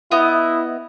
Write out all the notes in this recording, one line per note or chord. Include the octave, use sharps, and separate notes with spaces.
B3 E4 D#5